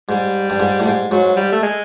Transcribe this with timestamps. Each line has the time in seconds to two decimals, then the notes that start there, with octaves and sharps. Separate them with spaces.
0.09 G#2 G3
0.50 G2
0.60 G#2
0.80 A2
0.86 G#2
1.11 G#2 F#3
1.36 G3
1.52 A3
1.62 G#3